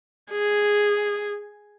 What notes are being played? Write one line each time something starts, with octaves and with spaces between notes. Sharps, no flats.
G#4